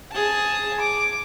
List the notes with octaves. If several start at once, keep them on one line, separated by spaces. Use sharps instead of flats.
G#4 A5
D6